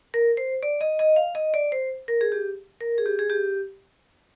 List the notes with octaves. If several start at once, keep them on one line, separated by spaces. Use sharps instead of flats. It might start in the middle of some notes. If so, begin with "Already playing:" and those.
A#4
C5
D5
D#5
D#5
F5
D#5
D5
C5
A#4
G#4
G4
A#4
G#4
G4
G#4
G4